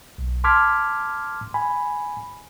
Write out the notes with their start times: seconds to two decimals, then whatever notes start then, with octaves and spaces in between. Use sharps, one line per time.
0.18 B1
0.44 A5 C6 D6 F6 G#6 B6
1.54 G#5 B5